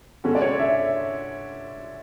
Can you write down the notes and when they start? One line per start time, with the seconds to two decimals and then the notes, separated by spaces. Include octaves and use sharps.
0.24 D3 G#3 C#4 F#4 A4
0.35 D5
0.41 C#5
0.59 E5